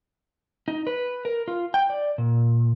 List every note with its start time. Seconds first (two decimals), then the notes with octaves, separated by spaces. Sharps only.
0.68 D#4
0.87 B4
1.25 A#4
1.48 F4
1.74 G5
1.90 D5
2.18 A#2